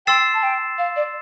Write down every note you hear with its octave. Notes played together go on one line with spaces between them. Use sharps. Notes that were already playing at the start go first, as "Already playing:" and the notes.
G5 C6 E6 A6 C7 E7
A5
G5
F5
D5